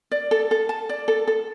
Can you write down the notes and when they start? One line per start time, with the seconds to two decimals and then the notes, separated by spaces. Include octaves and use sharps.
0.11 D5
0.31 A4
0.51 A4
0.69 A5
0.89 D5
1.08 A4
1.27 A4